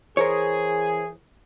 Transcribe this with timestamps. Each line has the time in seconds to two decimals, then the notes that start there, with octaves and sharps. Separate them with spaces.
0.17 E3 G#4 A#4 C5 C#5